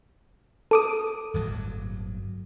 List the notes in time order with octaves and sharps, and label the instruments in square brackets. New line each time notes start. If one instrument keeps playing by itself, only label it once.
[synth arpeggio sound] A4 D6 D#6
[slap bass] D1 G1 F#3